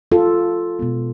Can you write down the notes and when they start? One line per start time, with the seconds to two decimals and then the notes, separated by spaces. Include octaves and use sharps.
0.12 F4 A4
0.79 B2 G#3 B3